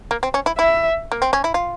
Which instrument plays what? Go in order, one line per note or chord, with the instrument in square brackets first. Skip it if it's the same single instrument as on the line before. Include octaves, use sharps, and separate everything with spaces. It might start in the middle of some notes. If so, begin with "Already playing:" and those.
[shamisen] A#3
C4
C#4
E4
[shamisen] E4 [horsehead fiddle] E5
[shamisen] A#3
C4
C#4
E4
F4